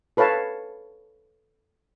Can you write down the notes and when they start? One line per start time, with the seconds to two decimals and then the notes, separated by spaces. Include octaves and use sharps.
0.17 A4 B4 C#5 F5 A5